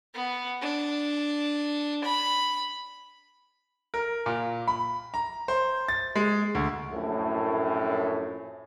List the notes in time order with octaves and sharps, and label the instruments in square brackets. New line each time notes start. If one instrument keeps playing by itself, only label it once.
[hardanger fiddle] B3
D4
B5
[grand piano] A#4
A#2
B5
A#5
C5
A6
G#3
D2
[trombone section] A#1 F#2 A2